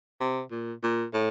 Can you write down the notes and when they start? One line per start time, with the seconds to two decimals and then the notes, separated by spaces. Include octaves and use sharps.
0.21 C3
0.51 A#2
0.83 A#2
1.13 A2